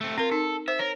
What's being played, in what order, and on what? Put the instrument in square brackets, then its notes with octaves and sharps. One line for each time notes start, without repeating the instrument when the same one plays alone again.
[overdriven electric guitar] A3 C4
[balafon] C4 A#4 [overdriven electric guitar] F4
[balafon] D#4 [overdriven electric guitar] A4
[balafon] C5 [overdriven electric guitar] E5
[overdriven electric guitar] A#4 [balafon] C#5